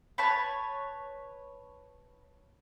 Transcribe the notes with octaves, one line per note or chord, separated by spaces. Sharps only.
B4 C#5 A5